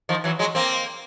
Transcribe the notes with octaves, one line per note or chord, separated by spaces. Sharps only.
D#3 F3
E3 F#3
F#3 G#3
A#3 C4